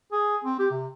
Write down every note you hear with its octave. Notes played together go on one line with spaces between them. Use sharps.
G#4
C4
G4
C3